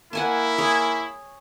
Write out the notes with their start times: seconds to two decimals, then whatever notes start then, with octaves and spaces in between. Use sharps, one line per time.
0.13 A#3 E4 F#5 G#5 A5
0.58 G#4 C#5